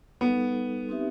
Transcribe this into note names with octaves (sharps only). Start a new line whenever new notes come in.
G3 B3 D#4 A4
C4 D#4 G4 B4 E5